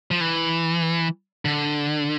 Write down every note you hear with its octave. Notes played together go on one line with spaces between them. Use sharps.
F3
E3
D3